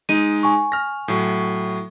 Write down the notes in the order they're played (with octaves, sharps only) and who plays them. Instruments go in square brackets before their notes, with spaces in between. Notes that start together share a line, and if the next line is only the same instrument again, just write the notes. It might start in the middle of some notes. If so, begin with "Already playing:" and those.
[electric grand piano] G#3 D#4 [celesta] D#7
[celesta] G#5 C#6
[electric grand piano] F6 A#6
A2 F#3